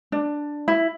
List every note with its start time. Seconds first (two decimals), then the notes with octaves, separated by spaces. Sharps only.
0.12 D4
0.68 E4